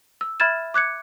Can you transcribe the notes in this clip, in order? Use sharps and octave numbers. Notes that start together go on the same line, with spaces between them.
E6
E5 B5 F6 G#6 A6 E7
D6 F#6 G#6 C#7